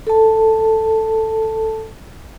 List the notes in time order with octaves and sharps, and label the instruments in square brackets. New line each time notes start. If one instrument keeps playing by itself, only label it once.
[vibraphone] A4 A5